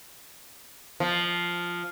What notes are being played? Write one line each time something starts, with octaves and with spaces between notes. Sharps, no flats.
F3